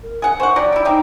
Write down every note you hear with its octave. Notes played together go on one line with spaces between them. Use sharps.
A#4
G#4 F#5
C5 F#5 C#6
F#3 G4 D5
E4 G4
C4 D#4 G4 G5